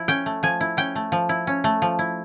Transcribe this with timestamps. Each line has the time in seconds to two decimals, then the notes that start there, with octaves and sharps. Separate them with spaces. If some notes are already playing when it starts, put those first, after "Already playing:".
Already playing: F3 E4
0.08 C#4 G5
0.26 A3
0.43 F3 G#5
0.61 E4
0.77 C#4 G5
0.96 A3
1.12 F3
1.29 E4
1.47 C#4
1.64 A3
1.82 F3
1.99 E4